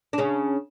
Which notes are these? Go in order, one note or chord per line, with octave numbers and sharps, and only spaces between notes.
D4
C#3 C#4